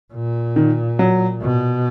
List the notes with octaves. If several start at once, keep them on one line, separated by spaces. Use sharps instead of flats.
A#2
D#3
F#3
B2